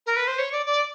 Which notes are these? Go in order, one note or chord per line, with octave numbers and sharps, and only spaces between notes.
A#4
B4
C5
C#5
D5
D5